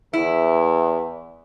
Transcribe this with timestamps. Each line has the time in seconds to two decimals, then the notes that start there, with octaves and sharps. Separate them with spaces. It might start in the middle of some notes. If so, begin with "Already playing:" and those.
0.13 E2 E4